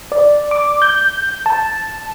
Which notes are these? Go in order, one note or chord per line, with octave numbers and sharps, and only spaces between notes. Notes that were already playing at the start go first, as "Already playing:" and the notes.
D5
D6
G6
A5